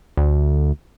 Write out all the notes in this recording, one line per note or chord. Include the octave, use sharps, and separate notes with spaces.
D2